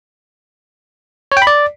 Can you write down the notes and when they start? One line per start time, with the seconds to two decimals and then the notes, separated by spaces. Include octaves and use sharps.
1.32 C#5
1.37 G5
1.42 B5
1.47 D5